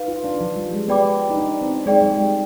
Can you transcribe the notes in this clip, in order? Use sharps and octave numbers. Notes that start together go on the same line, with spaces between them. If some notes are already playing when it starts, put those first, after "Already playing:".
Already playing: D#4 B4 F5
F4
D4
F3
G3
G#3
B3 G4 D5 G5 B5 D6
D#4
D4
C4
G#3 D#4 G#4 D5 G5
G3
G#3